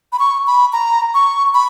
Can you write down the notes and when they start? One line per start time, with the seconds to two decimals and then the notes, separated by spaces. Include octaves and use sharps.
0.12 B5
0.19 C#6
0.47 B5
0.73 A#5
1.14 C#6
1.54 B5